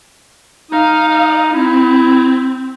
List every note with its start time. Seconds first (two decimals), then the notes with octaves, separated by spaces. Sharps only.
0.71 D#4 D#5 F5
1.53 C4 E4